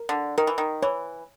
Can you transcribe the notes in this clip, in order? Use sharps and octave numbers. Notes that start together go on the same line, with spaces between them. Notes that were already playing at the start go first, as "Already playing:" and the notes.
Already playing: A#4
D3
D#3 A#4
E3
D#3
E3 C#5